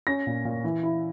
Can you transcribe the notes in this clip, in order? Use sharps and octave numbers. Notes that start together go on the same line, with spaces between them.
C#4 A#6
A#2
A#2
E3
E4